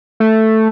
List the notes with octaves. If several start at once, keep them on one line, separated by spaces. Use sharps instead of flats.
A3